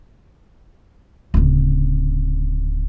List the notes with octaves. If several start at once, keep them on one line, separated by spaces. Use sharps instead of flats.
D1 C#3